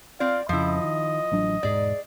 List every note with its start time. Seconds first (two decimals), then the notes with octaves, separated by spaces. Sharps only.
0.20 C4 F4 D5 F5
0.49 F2 C#3 F3 E4 D#5
0.83 D#3
1.32 A1 F#3 D4
1.63 E1 G#2 G#4 D5